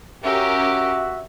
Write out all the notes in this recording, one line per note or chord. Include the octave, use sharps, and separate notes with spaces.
C#4 F#4 G4 A#4 E5